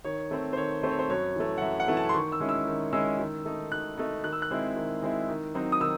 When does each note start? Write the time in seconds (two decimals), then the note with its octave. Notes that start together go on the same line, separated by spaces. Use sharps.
0.04 D#3 C#5
0.31 A3 C4
0.53 C5
0.57 D#3 C#5
0.83 A3 C4 C5
0.91 C#5
0.99 C5
1.10 F#2 C#5
1.36 E3 A3
1.58 F#5
1.62 F#2 E5
1.80 F#5
1.88 E3 A3
1.97 A5
2.09 C6
2.14 D#3 C#6
2.32 E6
2.40 G#3 C#4 E4
2.49 E6
2.67 D#3
2.93 G#3 C#4 E4 E6
3.19 D#3
3.45 A3 D#4
3.72 D#3 F#6
3.98 A3 D#4
4.24 D#3 F#6
4.33 E6
4.42 F#6
4.51 G#3 C4 E4
4.76 D#3
5.02 G#3 C4 E4
5.29 D#3
5.55 F#3 C4 D#4
5.72 D#6
5.81 D#3 E6